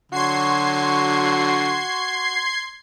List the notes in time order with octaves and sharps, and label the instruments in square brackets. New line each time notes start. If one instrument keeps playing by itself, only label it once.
[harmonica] D3 F#3 [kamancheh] F#4 C#6 [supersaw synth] C6 G#6 C7